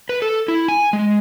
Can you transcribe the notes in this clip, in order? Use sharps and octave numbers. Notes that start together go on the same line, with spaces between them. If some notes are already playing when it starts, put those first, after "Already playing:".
B4
A4
E4
G#5
G#3